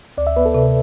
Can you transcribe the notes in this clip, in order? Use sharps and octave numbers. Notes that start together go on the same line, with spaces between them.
D2 D5
E5
B3 B4
A4
C3